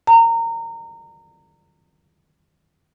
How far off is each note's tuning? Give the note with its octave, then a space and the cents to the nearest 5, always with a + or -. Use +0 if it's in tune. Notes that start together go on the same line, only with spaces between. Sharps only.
A#5 -25